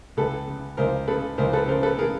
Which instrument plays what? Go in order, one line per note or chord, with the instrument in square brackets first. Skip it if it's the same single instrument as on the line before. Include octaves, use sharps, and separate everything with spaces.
[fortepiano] C#2 A4 B4
C#3
C#2 A#4 C5
C#3 A4 B4
C#2 A#4 C5
A4 B4
C#3 A#4 C5
A4 B4
C#3 G#4 A#4